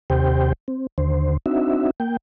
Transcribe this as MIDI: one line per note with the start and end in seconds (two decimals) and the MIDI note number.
0.10 0.53 39
0.10 0.53 48
0.10 0.53 67
0.10 0.53 72
0.10 0.53 79
0.68 0.87 60
0.98 1.37 39
0.98 1.37 50
0.98 1.37 72
1.46 1.91 60
1.46 1.91 62
1.46 1.91 63
1.46 1.91 66
1.46 1.91 76
2.00 2.17 58
2.00 2.17 79